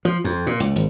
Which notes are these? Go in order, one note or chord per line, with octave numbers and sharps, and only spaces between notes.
F3
F2
A#2
C#2
G#1